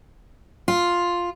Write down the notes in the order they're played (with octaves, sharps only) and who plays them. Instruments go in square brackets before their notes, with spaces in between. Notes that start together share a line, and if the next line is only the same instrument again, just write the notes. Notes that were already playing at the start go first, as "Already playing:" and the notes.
[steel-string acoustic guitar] F4